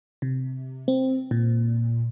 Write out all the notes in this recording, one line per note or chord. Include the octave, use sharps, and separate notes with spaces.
C3
C4
A#2